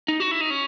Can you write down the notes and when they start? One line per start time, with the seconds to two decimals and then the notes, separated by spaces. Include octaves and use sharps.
0.08 D#4
0.20 F#4
0.31 E4
0.41 D#4
0.50 C#4